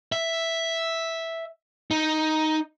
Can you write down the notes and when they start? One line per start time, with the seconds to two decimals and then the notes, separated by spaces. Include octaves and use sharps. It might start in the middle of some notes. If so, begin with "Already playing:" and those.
0.12 E5
1.91 D#4